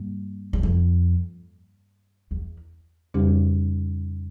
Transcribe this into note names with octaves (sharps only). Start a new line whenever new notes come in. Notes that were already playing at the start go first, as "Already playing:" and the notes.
Already playing: G2 G3 A#3
E2
F2
E2
F2 C#3 G3 C#4 G4